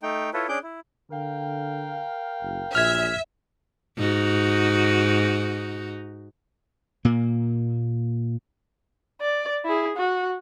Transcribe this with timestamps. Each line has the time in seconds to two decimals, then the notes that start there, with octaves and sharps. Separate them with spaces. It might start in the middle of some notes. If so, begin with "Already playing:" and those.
0.03 A3 D#4 G5
0.34 E4 F4 A4 B4 C#5
0.49 C#4 D4 G#4 D6 G6
0.63 E4
1.11 D3 A#4 F5 G5
2.42 F#1
2.75 A#1 F#2 A#2 E5 F6 G#6
3.98 G#2 D#4 F#4
7.05 A#2 A#3
9.21 D5
9.65 E4 G#4
9.96 F#4